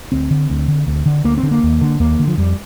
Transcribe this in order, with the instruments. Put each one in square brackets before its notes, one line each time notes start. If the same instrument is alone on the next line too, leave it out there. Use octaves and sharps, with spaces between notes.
[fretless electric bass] D2 C4
D3
D2
D3
D2
D3
D2 A#3
C4
D3
A#3
D#2
D3
D#2 A#3
D3
F3
F2 G3